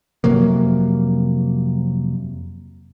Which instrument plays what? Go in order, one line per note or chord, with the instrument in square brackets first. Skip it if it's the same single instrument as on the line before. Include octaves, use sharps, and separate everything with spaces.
[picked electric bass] F2 C3 F#3 A#3